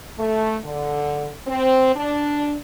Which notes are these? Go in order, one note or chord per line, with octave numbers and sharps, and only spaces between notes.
A3
D3
C4
D4